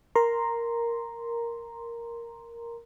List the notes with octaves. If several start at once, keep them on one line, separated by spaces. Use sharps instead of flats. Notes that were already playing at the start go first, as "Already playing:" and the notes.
A#4 A#5 C6